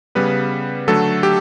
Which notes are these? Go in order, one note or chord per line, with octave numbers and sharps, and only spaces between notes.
C#3 G3 B3 B4
D3 F#3 A3 A4
G4